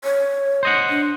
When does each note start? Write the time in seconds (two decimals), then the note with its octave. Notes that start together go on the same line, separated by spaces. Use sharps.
0.04 C#5
0.63 C5 D#5 F#5
0.90 D4